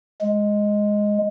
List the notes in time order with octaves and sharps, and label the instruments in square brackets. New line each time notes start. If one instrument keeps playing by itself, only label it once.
[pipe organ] G#3